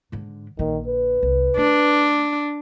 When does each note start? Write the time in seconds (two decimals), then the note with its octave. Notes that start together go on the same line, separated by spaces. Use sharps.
0.12 G#2 D3
0.59 A#1 D3 D#3
0.88 B4
1.23 C2
1.57 A3 D4